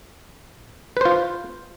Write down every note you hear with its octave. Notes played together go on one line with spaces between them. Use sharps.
F4 B4 C5